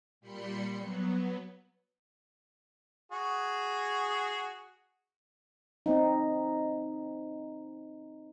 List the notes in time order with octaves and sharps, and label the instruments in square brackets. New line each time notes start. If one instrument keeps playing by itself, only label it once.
[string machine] A#2 G3 B5 C6 C#7
F#3 B3
[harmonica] F#4 G#4
[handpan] C4 D#4